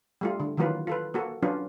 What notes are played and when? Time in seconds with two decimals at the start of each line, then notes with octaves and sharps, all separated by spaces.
0.21 G3 A3 F4
0.40 D3
0.57 D#3 E3 F#3 A#3 F4 B4
0.87 F4 A4 B4
1.14 A#3 F#4 A4
1.42 F#3 C#4 D4 F4 B4